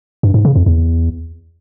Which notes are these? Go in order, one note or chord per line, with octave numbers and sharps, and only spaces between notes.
G2
G#2
C#3
F2
E2